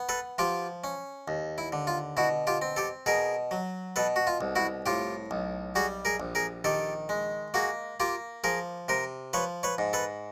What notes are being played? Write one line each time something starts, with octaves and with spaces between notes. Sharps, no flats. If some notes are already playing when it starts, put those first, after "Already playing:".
Already playing: B3
A4 B4
F3 F4 G4
C#4
D#2
E4
D3
F4
B2 E4 F#4
F4 G4
C4
G4 A4
B2 G#4 A#4
F#3
B2 A4 B4
F#4
F4
C2
E4 F#4
A2 F4 G4
B1
G3 F#4 G#4
G#4 A#4
A#1
G#4 A#4
D#3 G4 A4
G#3
A#3 F#4 G#4
A#3 F4 G4
F3 G#4 A#4
C3 A#4 C5
F3 B4 C#5
B4 C#5
G#2
A4 B4